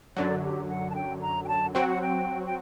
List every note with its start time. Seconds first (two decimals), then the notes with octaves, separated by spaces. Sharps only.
0.17 F#2 D3 F#3 D5
0.43 G4
0.69 F#5
0.90 A5
0.95 G5
1.21 A#5
1.45 G5
1.48 A5
1.74 F#3 C4 F#4 G5
1.89 F#5
2.02 G5
2.46 G5